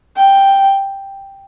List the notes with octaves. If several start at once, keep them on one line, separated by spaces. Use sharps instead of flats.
G5